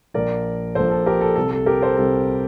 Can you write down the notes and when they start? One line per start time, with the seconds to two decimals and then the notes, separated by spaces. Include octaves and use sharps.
0.14 A#1 A#2 F3 A#4 D5
0.75 A#1 A#2 F3 A4 C5
0.91 A4
1.06 G4 A#4
1.21 A4
1.36 C2 C3 G3 A4
1.51 A4
1.66 G4 A#4
1.82 A4 C5
1.97 C2 C3 G3 A4